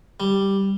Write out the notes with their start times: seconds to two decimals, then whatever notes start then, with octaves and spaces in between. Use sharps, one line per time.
0.20 G3